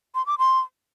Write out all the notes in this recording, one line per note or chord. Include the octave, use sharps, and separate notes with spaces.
C6
D6
C6